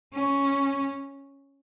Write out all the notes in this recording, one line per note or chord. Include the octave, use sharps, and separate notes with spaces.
C#4